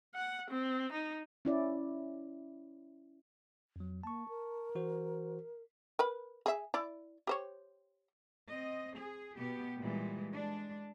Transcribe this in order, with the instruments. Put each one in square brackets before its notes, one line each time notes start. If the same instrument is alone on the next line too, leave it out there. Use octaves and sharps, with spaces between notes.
[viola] F#5
C4
D#4
[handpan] C#4 E4 D5
[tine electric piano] F2 F#3
[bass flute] A#3 [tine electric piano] A5 C#6
[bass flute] A#4
[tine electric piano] E3 F#4 C5
[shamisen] A#4 B4 B5
G#4 E5
E4 D5
G4 C5 C#5
[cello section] C4 D#5
G#4
B2 B3 G4
A#2 E3 G3 G#3
G#3 D4